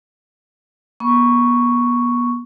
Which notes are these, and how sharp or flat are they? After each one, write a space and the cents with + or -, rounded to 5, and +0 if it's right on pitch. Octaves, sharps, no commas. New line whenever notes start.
B3 -35 C#6 +0